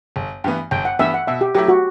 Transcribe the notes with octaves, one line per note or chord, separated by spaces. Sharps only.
G1
G2 E3 B3
G1 G5
F#5
G2 E3 B3 E5
F#5
B2 E5
G4
F#3 A3 E4 G4
F#4